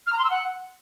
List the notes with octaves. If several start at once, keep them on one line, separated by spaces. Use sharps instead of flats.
F6
A#5
C6
E6
F#5